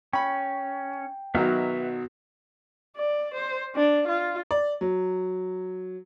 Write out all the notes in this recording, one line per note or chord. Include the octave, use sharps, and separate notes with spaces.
C#4 G5 B5 C#6
B1 D#3 F#3 B3 F#4 B4 E5 F6
D5
C5
D4
F4
D5
F#3